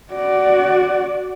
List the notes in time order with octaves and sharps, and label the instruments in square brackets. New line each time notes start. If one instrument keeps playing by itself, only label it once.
[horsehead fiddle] F#4 D5